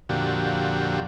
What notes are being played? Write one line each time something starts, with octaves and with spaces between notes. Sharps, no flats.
F2 A#2 D3 F#4 G4